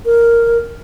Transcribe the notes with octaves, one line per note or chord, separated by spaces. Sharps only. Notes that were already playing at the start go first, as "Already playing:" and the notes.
A#4